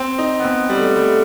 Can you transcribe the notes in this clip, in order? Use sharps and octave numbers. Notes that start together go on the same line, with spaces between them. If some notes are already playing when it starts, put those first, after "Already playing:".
Already playing: C4
D#4
B3
C4
G3
A3
G3
A3